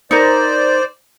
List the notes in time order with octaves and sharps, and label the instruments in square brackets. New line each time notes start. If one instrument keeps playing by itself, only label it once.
[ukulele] D#4 A#4 [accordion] C5 D5